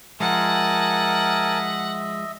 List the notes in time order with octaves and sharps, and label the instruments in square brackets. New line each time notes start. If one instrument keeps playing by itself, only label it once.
[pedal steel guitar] F3 G#3 [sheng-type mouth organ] A#4 G#5 A5 [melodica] D#5 E5 [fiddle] F#5